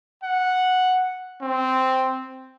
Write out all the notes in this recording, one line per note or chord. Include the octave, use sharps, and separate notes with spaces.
F#5
C4